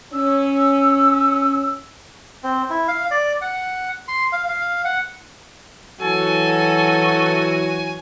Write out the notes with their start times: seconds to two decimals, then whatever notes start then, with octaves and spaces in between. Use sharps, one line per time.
0.13 C#4 E6
2.44 C4
2.70 E4
2.88 F5
3.11 D5
3.41 F#5
4.08 C6
4.32 F5
4.48 F5
4.85 F#5
6.01 E3 F#3 F#4 A4 G#5